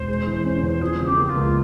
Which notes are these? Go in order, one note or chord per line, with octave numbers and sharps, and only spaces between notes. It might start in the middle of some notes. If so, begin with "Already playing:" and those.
Already playing: E1 C5
G#3
E3
C#4
E2
F3 G#4
C#3
G4
A#3
G4
F4
C#2